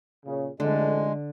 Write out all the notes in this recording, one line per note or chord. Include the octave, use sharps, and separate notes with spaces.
A#2 C#3
A1 F2 D3 G#3 A3